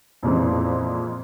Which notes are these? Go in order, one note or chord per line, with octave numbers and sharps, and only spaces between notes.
F2 A#2 E3 G#3 C4